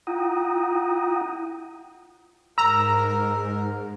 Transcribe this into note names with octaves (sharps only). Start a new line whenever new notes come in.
E4 F4 F#5 G5 A#5 D#6
G#2 A#4 A#5 E6